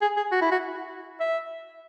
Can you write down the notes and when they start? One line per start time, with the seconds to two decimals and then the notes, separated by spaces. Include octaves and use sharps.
0.02 G#4
0.17 G#4
0.32 F#4
0.42 E4
0.51 F#4
1.20 E5